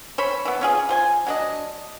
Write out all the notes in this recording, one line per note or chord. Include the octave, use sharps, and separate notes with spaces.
C5 C#5 B5
E3 B3
C#4 F4 G#4
F4 C5 G#5
F#3 D4 D#5